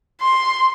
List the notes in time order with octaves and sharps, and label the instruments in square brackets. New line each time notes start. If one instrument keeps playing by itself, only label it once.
[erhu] C6